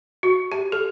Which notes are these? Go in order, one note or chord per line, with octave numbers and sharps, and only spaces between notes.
F#4
G4
A4